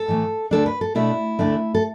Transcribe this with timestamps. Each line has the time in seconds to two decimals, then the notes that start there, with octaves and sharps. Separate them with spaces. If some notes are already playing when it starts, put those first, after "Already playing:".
Already playing: A4
0.08 A2 E3 A3
0.51 D2 D3 A3 D4 A4
0.66 B4
0.81 A4
0.95 B2 A3 D4 E4
1.39 D2 D3 A3 D4
1.75 A4